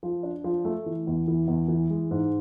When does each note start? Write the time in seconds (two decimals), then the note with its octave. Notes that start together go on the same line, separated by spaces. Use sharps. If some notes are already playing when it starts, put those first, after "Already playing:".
0.03 F3
0.23 D4
0.44 F3
0.65 A3
0.86 E3
1.07 E2
1.28 E3
1.48 E2
1.68 E3
1.90 G#3
2.11 G#2